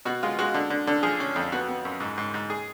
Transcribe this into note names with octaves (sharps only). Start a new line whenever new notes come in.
B2 F#4
G#3 F4
G#3 F#4
D3
D3
D3
F3 G#4
C#4
F2
B3 F#4
B3
F#2
G#2
G#2
G#2
G#4